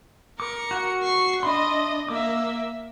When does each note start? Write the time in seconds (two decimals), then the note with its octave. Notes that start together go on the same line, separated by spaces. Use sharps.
0.40 A#4 D6 C#7
0.71 F#4 F#5
1.03 C#6 C7
1.43 D4 D#5 E5 B5 C6
2.08 A#3 E5 D6